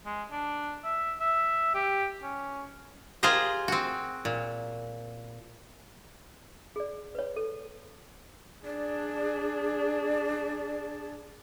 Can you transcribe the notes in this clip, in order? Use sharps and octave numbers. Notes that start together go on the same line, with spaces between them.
G#3
D4
E5
E5
G4
C#4
F4 G4 G#4 A#4 C5 D#5
C4 F#4
A#2
G#4 D5
B4 C#5
A4
D4 G#4 D5